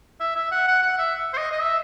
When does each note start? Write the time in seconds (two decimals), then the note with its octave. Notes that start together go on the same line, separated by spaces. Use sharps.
0.20 E5
0.36 E5
0.52 F#5
0.68 F#5
0.82 F#5
0.98 E5
1.34 C5
1.38 D#5
1.52 D#5
1.62 E5